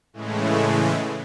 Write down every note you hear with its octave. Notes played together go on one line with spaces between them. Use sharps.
A2 C#3 E3 G#3 A3